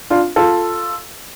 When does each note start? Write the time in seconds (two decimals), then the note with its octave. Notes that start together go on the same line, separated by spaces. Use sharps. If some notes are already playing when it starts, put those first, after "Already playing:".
0.10 D4 F4
0.36 F4 A4